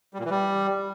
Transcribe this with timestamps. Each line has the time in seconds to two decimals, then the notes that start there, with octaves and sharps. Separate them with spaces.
0.14 G3
0.19 A#2
0.25 E3
0.30 G3